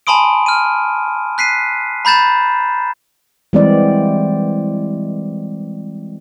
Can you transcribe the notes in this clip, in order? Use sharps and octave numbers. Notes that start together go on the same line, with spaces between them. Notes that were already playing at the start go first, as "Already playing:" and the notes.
G#5 A5 B5 C6 D#6 D7
F6 D#7
F#6 B6 C7 D#7
A#5 B5 G6 A6 E7
E3 G3 G#3 B3 C4 D5